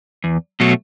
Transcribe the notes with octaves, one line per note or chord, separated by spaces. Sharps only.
E2
B2 F#3 A3